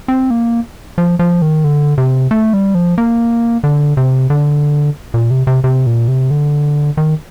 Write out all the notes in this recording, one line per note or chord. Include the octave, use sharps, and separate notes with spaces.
C4
A#3
F3
F3
D#3
D3
C3
A3
G3
F3
A#3
D3
C3
D3
A#2
C3
C3
C3
A#2
C3
D3
D#3